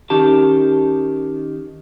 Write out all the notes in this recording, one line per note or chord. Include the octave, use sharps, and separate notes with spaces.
D#3 C#4 G4 A5